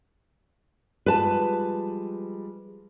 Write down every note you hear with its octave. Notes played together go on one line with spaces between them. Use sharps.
F3 G3 G#3 B4 A5